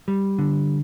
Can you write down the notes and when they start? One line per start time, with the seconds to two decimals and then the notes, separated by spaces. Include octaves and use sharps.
0.08 G3
0.38 D3